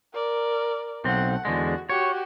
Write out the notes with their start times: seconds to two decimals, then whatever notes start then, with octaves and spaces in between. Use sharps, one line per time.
0.13 A#4 D5
1.05 B1 A3 C4 F#5
1.45 E2 D3 G#3 F#4
1.90 F#4 G4 C#5